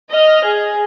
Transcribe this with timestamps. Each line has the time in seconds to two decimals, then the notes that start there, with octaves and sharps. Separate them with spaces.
0.12 D#5 F6
0.44 G#4